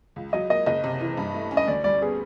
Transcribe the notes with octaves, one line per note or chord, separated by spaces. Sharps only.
C#2
F#3 D#5
A#3 D#5
F#1 D#5
C3
E3
G2
A3
C#4
D#5
D2 D5
G3 D5
B3 G#4